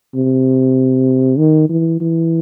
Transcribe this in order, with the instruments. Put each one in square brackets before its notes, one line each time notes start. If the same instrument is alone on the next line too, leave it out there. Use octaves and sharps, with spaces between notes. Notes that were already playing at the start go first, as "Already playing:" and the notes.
[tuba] C3
D#3
E3
E3